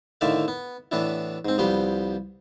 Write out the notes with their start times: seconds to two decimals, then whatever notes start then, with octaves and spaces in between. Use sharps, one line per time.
0.21 A2 D3 D#3 D5 E5 F5
0.48 B3
0.92 A2 E3 B3 D4 E4
1.45 G#2 C4
1.58 C2 F3 G3 B3 G4 C6